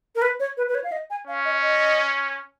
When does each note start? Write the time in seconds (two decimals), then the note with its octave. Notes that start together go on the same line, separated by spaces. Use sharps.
0.15 A#4
0.22 B4
0.40 C#5
0.57 B4
0.69 B4
0.75 C#5
0.84 F5
0.92 D#5
1.10 G#5
1.27 C#4 F5
1.45 D#5
1.62 D#5